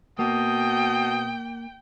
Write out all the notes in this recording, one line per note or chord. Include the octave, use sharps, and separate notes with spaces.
B2 A#3 G5 D#6